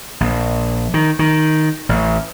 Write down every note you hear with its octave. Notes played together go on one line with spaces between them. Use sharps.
A#1
D#3
D#3
A1